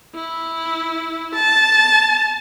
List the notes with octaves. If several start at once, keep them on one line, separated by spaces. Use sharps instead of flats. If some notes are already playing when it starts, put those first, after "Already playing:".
E4
A5